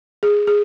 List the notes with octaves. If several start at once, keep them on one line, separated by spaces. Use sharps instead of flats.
G#4
G#4